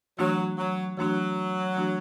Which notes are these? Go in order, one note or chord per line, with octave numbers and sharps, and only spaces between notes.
E3 F#3 A3 D4 F#4
F#3
E3 F#3 A3 D4 F#4
E3 A3 D4 F#4